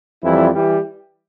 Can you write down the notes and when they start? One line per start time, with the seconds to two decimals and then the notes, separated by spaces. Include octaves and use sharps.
0.23 F2 E3 G3 E4
0.54 E3 G3